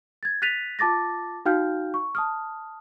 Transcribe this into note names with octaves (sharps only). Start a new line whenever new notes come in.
G#6 A6
F#6 A6 B6 D#7 F7
F4 A5 D6 A6 A#6
D#4 F#4 F5 G5 F6 G6
C#6
A5 D#6 F6